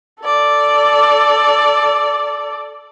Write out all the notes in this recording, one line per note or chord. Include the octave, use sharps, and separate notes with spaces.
A4 D5